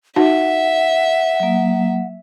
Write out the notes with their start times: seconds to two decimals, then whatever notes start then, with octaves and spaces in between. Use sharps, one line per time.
0.16 D#4 F#4 E5 F#5
1.40 F#3 A#3